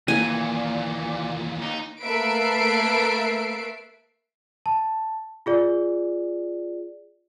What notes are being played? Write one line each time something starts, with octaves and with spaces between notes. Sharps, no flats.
D#2 A#2 E3 G#5
D#2 D#4
A3 A#3 B4 E5 C7 D7
A5
F4 G#4 D5